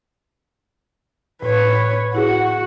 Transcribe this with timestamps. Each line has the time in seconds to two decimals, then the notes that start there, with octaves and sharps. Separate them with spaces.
1.42 A2 B4 C#5
2.15 E4 F#4 G#4 F#5